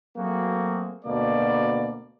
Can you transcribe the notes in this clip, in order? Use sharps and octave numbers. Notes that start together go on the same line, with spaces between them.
F#3 A3 A#3 C4 F#4 G#4
D2 B2 A#3 D5